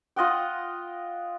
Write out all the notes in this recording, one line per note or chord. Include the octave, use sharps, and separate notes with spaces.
F4 D#5 F#5 G5